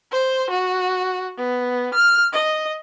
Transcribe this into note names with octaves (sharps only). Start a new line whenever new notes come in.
C5
F#4
B3
F6
D#5